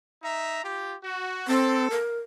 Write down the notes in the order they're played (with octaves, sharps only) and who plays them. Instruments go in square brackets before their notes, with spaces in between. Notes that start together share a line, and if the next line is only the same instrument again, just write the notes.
[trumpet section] D#4 E5 A#5
F4 G4
F#4
[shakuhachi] C4 [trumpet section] A4
[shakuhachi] A#4